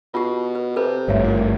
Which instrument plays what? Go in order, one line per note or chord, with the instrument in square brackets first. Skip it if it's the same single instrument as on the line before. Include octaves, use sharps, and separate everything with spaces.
[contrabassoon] B2 [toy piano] F4 G4
[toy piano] B4
[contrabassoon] C3 [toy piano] A4 B4
[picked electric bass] G#1 G2 A3 [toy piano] C#5 E5
[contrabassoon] A#2